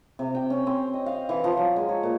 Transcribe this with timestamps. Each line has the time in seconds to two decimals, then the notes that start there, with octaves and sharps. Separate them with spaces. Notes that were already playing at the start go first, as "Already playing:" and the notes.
0.19 C3
0.35 G5
0.50 C#4
0.67 C4
0.94 D#5
1.06 F5
1.29 E3
1.44 F3
1.57 F#3
1.76 G#3
1.89 C#5
2.03 A#2